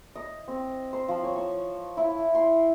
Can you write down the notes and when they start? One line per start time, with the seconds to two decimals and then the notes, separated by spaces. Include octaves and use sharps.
0.16 D#5
0.48 C4
0.93 C5
1.08 F3
1.24 C#5
1.36 C#6
1.97 E4
2.35 C6